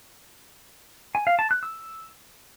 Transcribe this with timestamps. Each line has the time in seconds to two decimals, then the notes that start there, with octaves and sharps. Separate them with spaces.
1.15 G#5
1.27 F5
1.39 A5
1.51 F#6
1.63 E6